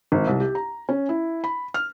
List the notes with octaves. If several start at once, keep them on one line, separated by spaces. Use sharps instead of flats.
G#1
C2
G4
A#5
C#4
E4
B5
F6